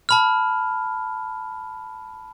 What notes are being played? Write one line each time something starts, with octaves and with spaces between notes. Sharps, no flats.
A5 B5 F6